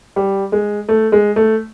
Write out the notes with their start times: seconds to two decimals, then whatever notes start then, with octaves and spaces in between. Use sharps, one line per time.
0.16 G3
0.52 G#3
0.89 A3
1.12 G#3
1.36 A3